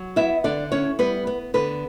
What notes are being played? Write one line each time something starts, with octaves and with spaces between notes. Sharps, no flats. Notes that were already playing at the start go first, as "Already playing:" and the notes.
Already playing: F#3
B3 E4 E5
D3 D4 D5
C#4 E4 C#5
G3 B3 B4
B3
D3 B3 B4